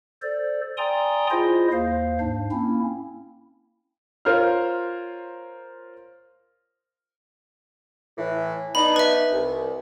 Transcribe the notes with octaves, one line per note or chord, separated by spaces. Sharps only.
A4 C5 D5
D5 G5 G#5 A#5 C6 D#6
E4 F4 G#4 C5 D#5
D#2 C5 F5
G#2 D4
A#3 C4 C#4 E4
F4 A#4 C5 C#5 F5 F6
A2 E3
B3 D4 D#4 B5
B4 E5
C2